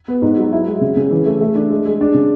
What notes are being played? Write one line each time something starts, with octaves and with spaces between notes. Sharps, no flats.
B3
G#2
F#3
E4
G#3
C#3
C#3
E3
A3
A3
D4
G#3
G#3
D4
C#3